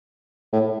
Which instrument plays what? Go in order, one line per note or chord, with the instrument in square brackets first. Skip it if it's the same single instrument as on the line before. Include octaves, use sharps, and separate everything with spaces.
[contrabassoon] A2